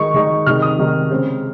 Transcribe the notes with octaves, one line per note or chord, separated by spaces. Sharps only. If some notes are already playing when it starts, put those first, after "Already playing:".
Already playing: D#3 G#3 D#4 C#6
D#3 G#3 D#4
C3 D#3 G#3 D#4 F6
D#6
C3 D#3 G#3 D#4
C#3 G#3 C4